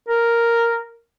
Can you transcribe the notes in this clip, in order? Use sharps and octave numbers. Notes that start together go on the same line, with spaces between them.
A#4